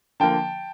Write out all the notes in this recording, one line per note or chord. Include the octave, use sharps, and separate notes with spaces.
D3 F3 A#3 G5 A5